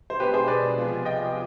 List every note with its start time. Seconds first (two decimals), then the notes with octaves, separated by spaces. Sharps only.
0.10 C5
0.19 B2 G#3 D4 G4 B4
0.33 G#4 C5
0.48 B4 D5
0.76 C3 F3 B3 F4 G#4
1.05 D#5 G5